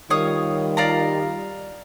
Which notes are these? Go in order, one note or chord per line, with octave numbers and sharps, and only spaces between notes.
D#3 G3 F4 C#5 F5 D#6
D5 F5 A#5